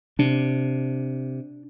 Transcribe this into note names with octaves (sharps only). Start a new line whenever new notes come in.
C3 D4